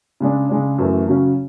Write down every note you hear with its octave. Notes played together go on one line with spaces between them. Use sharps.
C#3 G#3 D4
C#3 G#3 D4
F#2 E3 A3
C#3 F#3 C#4